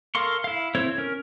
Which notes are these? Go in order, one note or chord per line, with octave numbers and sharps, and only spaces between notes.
A4 A#4 F5 C6 C#6
E4 F5
C4 E4 A4 C5 C#5
C#4 A#4